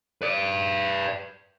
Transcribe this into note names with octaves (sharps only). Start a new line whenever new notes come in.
B4 D5